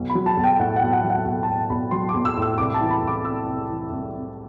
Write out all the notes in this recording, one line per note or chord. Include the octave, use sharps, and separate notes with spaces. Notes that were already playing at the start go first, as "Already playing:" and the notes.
Already playing: B1
B5
F#3
A5
B1
G5
A2 F#5
F#5
B1
F#5
F#3
F#5
B1 F#5
A5
A2 G5
B1 B5
F#3 C6
D6
B1
E6
A2
E6
C2 D6
A5
E3
B5
C2
D6
C3 E6
C2
E3
C2
C3